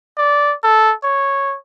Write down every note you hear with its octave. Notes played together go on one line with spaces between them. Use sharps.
D5
A4
C#5